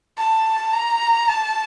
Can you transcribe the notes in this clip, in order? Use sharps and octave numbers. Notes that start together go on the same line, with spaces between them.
A5
A#5
A5